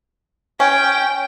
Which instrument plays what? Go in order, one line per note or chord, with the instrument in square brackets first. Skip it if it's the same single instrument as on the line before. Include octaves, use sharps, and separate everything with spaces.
[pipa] C#4 [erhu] G5